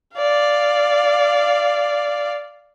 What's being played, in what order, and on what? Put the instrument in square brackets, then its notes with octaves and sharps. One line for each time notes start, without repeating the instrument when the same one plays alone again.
[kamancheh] D5 F5